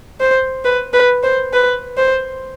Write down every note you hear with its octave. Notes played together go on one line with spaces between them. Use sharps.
C5
B4
B4
C5
B4
C5